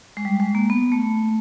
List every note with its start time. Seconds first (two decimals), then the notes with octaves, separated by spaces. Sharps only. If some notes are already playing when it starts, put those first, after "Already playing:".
0.17 G#3
0.25 G3
0.40 G#3
0.55 A#3
0.70 B3
0.92 A3